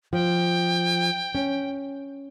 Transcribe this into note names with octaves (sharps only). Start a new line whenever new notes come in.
F3 G5
C#4